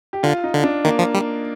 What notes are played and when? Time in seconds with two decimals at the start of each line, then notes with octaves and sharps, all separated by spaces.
0.13 G4
0.23 D3 F4
0.44 D#4
0.54 D3
0.64 D4
0.85 D#3 A#3
0.99 F3
1.14 G3